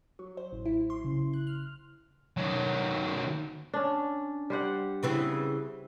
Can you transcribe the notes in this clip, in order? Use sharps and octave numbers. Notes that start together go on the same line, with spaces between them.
F#3
C5
A1
E4
C6
C#3
F#6
F6
D#3 F#3
C#4 D4
G3 C5 F#5
C#3 E3 C4